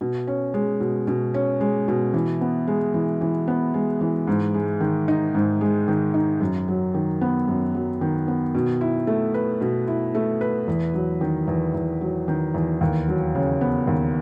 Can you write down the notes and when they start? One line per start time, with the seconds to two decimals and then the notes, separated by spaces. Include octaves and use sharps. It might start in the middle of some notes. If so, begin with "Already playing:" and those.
0.01 B2
0.27 C#4
0.54 G#3
0.80 B2
1.07 B2
1.34 C#4
1.61 G#3
1.88 B2
2.14 E3
2.41 B3
2.67 G#3
2.94 E3
3.21 E3
3.48 B3
3.74 G#3
4.01 E3
4.27 G#2
4.54 G#3
4.81 D#3
5.08 D#4
5.35 G#2
5.61 G#3
5.88 D#3
6.14 D#4
6.41 F#2
6.68 F#3
6.94 D#3
7.21 B3
7.48 F#2
7.74 F#3
8.01 D#3
8.28 B3
8.55 B2
8.81 E4
9.07 A3
9.34 B4
9.61 B2
9.88 E4
10.15 A3
10.41 B4
10.68 E2
10.94 F#3
11.21 D#3
11.48 E2
11.74 E2
12.01 F#3
12.28 D#3
12.54 E2
12.81 D#2
13.08 F#3
13.35 C#3
13.61 B3
13.87 D#2